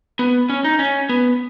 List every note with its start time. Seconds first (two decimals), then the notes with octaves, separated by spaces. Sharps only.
0.19 B3
0.50 C#4
0.64 D#4
0.79 C#4
1.09 B3